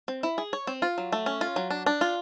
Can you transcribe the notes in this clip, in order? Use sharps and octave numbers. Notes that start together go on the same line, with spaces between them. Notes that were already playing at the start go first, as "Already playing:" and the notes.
C4
E4
G#4
C#5
C4
F4
F#3
A3
C#4
F4
F#3
D4
D4
F4